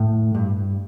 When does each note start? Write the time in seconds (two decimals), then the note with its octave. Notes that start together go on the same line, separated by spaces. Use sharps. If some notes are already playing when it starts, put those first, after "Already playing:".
Already playing: A2
0.35 G2